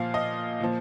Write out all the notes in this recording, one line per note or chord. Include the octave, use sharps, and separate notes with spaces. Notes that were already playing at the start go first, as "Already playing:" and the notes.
Already playing: A#2 F3 F5
D#5
A#2 F3